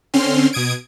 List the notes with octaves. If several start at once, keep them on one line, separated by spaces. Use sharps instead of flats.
D3 C4 C#4 C6 F6
B2 D#6 G#6 D7